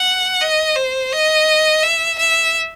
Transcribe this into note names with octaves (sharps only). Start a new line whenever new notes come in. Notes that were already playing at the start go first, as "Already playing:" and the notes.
Already playing: F#5
D#5
C5
D#5
E5
E5